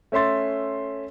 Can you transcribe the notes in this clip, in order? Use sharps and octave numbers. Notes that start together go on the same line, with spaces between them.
A3 C#4 E5 C6 A6